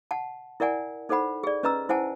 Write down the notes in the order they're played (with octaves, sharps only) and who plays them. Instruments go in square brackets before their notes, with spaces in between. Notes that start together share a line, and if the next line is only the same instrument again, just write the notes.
[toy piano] F#5 A5
E4 A#4 D5 F#5 G#5
D#4 A4 C5 F#5 B5
G#4 D5
C#4 B4 D#5 A#5 E6
E4 C5 F#5 G#5 A5